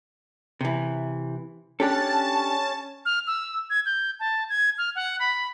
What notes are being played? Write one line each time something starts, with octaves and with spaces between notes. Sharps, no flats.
C3 E3
C#4 D4 G4 A4 A5
F6
E6
G#6
G6
A5
G#6
F6
F#5
B5